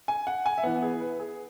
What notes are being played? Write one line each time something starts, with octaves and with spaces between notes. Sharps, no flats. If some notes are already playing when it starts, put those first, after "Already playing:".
G#5
F#5
G#5
E5
E3 B3 F#5
G#4
B4
G#4